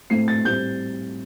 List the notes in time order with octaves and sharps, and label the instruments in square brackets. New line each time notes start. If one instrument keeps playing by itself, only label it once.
[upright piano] A2 A3 C4 C7
A6
A2 G3 C4 G6